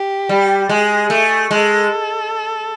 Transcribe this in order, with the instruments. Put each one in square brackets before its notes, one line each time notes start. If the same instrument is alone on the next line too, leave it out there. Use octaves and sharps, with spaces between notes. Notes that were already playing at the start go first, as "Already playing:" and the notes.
Already playing: [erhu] G4
[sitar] G3
[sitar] G#3 [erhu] G#4
[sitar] A3
[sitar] G#3 [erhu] A4